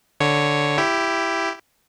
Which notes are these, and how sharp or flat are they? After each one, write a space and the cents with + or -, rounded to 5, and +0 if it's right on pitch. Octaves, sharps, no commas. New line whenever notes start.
D3 +0 C#5 +0
E4 +10 G4 +0